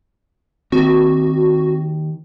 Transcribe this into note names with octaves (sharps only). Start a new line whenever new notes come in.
D#2 C4 F#4